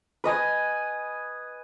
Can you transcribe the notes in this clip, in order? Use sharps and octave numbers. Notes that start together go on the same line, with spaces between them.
B4 D#5 G#5